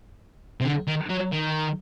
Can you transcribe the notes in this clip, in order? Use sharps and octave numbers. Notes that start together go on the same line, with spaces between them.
C3
D3
D#3
F#3
D#3